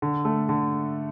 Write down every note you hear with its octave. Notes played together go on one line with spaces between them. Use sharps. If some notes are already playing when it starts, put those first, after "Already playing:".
D3
A3
D3